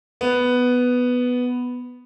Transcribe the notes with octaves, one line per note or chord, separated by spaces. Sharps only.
B3